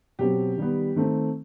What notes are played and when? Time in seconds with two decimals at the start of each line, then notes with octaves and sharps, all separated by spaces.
0.19 B2 F#3 C4 G4
0.57 D#3 G3 B3
0.96 D#3 A3 C4